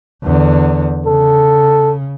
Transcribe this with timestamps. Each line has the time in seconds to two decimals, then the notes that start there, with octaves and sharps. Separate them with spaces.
0.23 E2 D3
1.06 C#3 A4